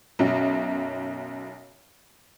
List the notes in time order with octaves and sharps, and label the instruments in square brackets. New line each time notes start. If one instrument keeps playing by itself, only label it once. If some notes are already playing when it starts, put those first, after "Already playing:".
[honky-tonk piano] B1 F#2